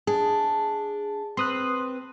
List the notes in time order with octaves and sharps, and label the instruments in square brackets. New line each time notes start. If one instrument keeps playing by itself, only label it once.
[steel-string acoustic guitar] D4 [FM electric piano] G#4
[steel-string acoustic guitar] C4 B4 [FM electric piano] C6 D#6 F#6